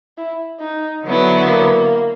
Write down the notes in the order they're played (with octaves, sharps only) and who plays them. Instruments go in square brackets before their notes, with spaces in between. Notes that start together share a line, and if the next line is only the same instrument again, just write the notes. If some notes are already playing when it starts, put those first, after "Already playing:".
[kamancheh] E4
D#4
[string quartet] D3 F#3 B3 E4
[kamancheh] A#3